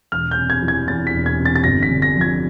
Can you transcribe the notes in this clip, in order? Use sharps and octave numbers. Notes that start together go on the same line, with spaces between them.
E1 F6
G6
C3
G#6
E3
G#6
E2 A6
B6
E1
G#6
C3
A6
A6
G1 A#6
B6
D3
A#6
F3
G#6